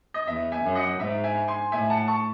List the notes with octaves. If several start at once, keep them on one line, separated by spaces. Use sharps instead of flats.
D#5
E2 E5
E5 G#5
F#2
D#5 F#5
G#2 E5
E5 G#5
G#5 C6
A2 E5 G#5
F#5 A5
A5 C#6